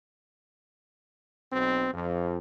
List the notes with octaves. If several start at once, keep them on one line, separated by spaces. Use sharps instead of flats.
B1 B2 C4
F2